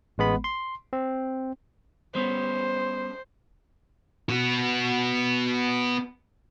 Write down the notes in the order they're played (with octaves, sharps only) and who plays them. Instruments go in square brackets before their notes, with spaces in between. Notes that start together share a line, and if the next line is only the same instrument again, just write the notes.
[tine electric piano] A1 G#3 B3 B5
C6
C4
[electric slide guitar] G3 B3 C#4 [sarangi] C5
[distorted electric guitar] B3 F#4